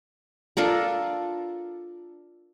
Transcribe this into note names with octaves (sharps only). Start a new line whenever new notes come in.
D4 F4 A4 A#4